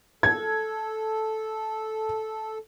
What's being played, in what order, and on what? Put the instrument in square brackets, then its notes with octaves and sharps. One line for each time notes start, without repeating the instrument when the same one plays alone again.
[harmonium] A4 [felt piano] G#6